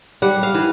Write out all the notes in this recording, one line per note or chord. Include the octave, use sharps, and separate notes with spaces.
G3 F#5
F5
E3